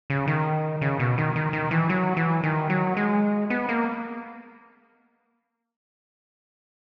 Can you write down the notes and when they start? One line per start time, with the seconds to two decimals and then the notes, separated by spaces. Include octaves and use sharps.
0.10 C#3
0.28 D#3
0.81 C#3
1.00 B2
1.18 D#3
1.36 D#3
1.53 D#3
1.71 E3
1.89 F#3
2.17 E3
2.44 D#3
2.70 F#3
2.97 G#3
3.50 B3
3.69 A#3